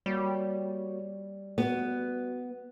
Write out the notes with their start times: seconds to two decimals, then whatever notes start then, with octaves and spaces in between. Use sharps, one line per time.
0.06 G3 A#3 F#4 C#5
1.58 B3 F#4